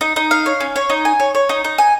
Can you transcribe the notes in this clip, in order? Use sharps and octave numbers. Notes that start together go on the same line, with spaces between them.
D#4
D#4
F5
C#5
C#4
C#5
D#4
G#5
C#5
C#5
D#4
D#4
G#5